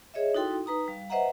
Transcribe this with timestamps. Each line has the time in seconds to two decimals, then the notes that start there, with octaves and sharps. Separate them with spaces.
0.14 G#4 C#5 D#5 E5
0.34 D#4 E4 F#4 A4 G5 C6
0.66 D#4 B4 A#5 D#6
0.88 G3 F5
1.10 B4 C5 D#5 E5 F#5 A#5